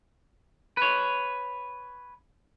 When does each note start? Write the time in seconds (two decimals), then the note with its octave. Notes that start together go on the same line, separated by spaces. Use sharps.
0.77 B4 C#5